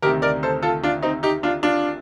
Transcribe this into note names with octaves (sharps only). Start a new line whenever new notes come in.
D2 C3 D#3 G4 A#4
A#4 D5
A4 C5
F4 A4
D4 F4
C4 D#4
D#4 G4
D4 F4
D4 F4